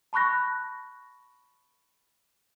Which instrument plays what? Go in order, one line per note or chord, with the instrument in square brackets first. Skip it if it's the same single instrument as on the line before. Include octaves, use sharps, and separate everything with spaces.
[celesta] A5 B5 C#6 F#6 A#6